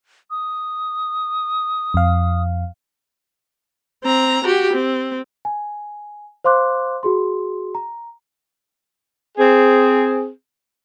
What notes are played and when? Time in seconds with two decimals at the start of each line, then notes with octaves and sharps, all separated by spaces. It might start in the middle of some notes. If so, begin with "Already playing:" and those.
0.31 D#6
1.94 F2 F5
4.04 C4 A#5
4.44 F#4 G4
4.73 C4
5.45 G#5
6.44 C5 F5 C6 D6 F#6
7.03 F#4 G#4 C6
7.75 A#5
9.38 C4 G#4